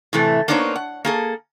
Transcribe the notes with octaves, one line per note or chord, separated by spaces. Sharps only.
A2 C3 E3 A3
A#3 B3 D4 D#4 C5 C#5
F#5
A#3 G#4 A4